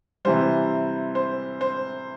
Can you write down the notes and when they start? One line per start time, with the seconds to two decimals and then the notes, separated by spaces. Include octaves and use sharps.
0.25 C3 E3 G3 C5
1.15 C5
1.61 C5